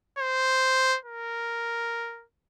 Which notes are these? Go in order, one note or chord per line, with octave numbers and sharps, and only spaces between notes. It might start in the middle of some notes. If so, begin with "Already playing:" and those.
C5
A#4